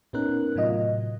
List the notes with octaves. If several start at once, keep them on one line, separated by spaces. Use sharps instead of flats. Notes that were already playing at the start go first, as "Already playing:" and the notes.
A#2 B3 C#4 D#4 A#4 F#6
A2 C3 F#3 F4 D#5